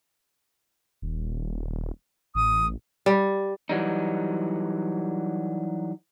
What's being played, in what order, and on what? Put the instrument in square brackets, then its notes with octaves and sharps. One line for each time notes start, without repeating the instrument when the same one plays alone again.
[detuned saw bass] D#1
[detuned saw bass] A1 [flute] D#6
[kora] G3
[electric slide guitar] E3 F#3 G3 D#4